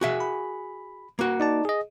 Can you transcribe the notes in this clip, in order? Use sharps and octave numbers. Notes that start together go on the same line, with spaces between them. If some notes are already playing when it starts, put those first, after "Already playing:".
F#4 G#4 E5
B5
A#3 F#4
D#4 D5 A5
G#4 D#5